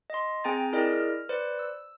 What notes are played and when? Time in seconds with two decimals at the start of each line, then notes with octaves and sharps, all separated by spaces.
0.10 D#5 C6
0.44 C4 G#4 G5 G#5 A#5 A6
0.73 E4 G#4 A#4 D5 D#5
0.93 F6
1.29 B4 C5 D5
1.59 E6